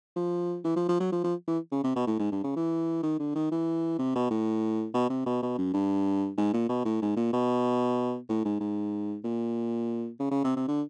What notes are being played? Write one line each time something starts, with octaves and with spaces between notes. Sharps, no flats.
F3
E3
F3
F3
F#3
F3
F3
E3
C#3
C3
B2
A2
G#2
G2
C#3
E3
D#3
D3
D#3
E3
C3
B2
A2
B2
C3
B2
B2
F#2
G2
G#2
A#2
B2
A2
G#2
A#2
B2
A2
G#2
G#2
A#2
C#3
C#3
C3
C3
D3